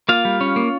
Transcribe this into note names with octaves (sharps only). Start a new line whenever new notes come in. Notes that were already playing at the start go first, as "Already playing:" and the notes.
A#3 F4 F5
G3
C#4
A#3